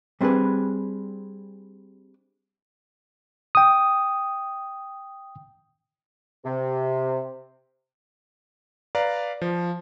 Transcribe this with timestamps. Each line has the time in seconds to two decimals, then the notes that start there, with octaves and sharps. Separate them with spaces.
0.21 G3 C4 D4 G#4 B4
3.55 G5 D#6
6.45 C3
8.95 B4 D5 F5 A#5
9.42 F3